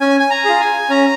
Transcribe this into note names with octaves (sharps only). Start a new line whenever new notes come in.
C#4 G#5
G#5
A#5
F4 G#4
G#5
C#4 A#5